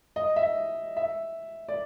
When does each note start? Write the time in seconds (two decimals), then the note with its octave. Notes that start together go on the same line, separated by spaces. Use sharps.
0.16 D#5
0.36 E5
0.96 E5
1.69 D5